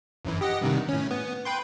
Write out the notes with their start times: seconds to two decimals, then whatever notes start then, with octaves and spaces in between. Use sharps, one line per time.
0.25 G1 F#2 E3
0.41 G4 D#5 F#5
0.61 G2 C3 D#3
0.89 A2 C#4
1.11 B3
1.45 B4 G5 C6